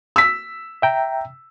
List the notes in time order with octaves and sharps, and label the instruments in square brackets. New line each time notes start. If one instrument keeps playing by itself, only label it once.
[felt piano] E6 B6
[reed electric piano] E5 G5 A#5